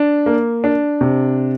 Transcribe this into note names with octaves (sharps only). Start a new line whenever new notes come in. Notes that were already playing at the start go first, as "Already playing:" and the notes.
Already playing: D4
A#3
D4
C3